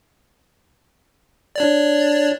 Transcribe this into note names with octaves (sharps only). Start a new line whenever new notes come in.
D4 C#5 D5